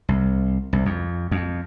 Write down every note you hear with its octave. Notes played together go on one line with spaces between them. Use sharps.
C2
C2
F2
F2